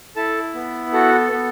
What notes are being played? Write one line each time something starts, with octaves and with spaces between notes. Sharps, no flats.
E4 A4 A5
B3
F#4 A4 F#5
B3